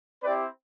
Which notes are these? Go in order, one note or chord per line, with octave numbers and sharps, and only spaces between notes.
C4 E4 G4 B4 D5